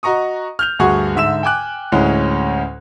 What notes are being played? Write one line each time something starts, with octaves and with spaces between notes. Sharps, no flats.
F#4 D#5 A#5 C#6 D#6
F6 G6 F7
D2 G2 F#4 G#4 F#5 C#6
G#2 D3 E5 E6 E7
G5 G#5 D6 F#6
D2 A2 G#3 C#4